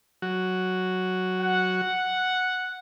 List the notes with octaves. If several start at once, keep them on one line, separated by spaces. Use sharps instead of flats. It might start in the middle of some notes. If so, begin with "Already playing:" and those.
F#3 F#4
F#5